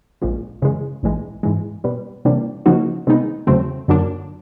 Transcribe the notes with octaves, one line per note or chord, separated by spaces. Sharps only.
A#1 A#2 F3 G#3
F#2 C#3 E3 G#3
A#1 A2 E3 G#3
G#2 E3 G#3
B2 G3 B3
C3 E3 G3 A#3 D4
C#3 F3 A#3 D#4 F#4
C3 D#3 G#3 B3 D#4
E2 C#3 F#3 A3 C4
F#2 D3 F#3 A#3 D4